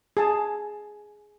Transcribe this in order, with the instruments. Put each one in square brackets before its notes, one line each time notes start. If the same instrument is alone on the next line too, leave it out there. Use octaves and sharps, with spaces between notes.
[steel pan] G#4 A5